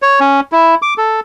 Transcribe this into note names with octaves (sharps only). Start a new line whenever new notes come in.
C#5
C#4
E4
D6
A4